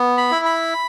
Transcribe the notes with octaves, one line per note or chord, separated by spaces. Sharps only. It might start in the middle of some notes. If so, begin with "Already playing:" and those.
Already playing: B3
B5
E4
B5